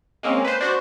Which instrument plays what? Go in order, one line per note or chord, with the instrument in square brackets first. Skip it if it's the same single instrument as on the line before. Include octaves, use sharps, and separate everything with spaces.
[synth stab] G#3 A#3 C4 C#4
B4 C5
D4 F#4 C5